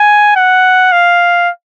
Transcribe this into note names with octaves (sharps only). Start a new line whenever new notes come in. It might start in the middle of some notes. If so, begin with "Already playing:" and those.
Already playing: G#5
F#5
F5